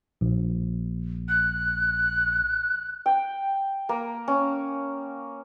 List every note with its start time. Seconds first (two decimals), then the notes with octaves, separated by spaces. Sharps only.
0.21 A#1
1.29 F#6
3.06 G5
3.89 A#3
4.28 C#4